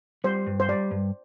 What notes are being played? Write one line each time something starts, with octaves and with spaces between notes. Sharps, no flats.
G3 C5
G2
C5
G3 D5
G2